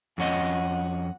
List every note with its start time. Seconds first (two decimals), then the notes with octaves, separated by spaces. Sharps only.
0.18 F2 C#4 D#5 F#5